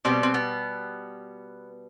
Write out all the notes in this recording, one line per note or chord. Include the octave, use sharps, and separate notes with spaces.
B2 G3 B3 C4
C4
B3